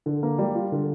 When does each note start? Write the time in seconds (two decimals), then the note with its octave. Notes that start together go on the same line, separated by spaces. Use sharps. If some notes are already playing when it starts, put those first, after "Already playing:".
0.06 D3
0.23 A#3
0.38 G3
0.55 F4
0.72 D3